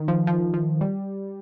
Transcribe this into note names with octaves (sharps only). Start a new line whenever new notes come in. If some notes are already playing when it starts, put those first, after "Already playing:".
Already playing: D#3
F3
F3
F3
G3